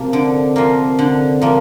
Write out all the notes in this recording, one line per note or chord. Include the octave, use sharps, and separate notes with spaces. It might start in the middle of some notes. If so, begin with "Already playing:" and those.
Already playing: C3 F3 A#3
D3
F3 A#3
D3
F3 A#3